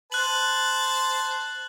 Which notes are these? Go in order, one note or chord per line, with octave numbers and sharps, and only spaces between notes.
C5 A5 F#6 F#7